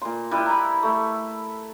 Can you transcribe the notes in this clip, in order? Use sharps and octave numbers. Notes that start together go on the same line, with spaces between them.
A#2 C6
G3 E4 B4
A#5 B5
A3